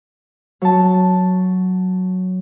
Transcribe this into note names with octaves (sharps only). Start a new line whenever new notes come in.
F#3 A5